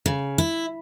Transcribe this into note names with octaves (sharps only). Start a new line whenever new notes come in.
C#3
E4